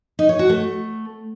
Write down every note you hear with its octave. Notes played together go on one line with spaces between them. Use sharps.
D#4
C#5
F#4
A3